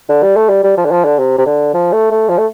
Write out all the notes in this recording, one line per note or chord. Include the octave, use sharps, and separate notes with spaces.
D3
G3
A3
G3
G3
F3
D3
F3
D3
C3
C3
D3
F3
A3
A3
F3
A3